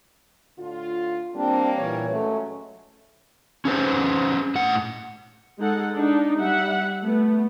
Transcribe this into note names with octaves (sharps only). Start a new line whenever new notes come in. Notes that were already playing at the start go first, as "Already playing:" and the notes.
A2 D3 F4
G3 A#3 C4 D4
A#2 E3 C#5
F#3 G#3 A3 C#4
C#4 G#4 B4 C5
A2 F#5
G#3 D#4 A4 F#5
D4 D#4
G3 E5 F#5
A3 B3